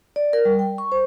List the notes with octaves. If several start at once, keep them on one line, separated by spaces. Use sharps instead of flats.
D5
A#4
G3
G5
C#6
C5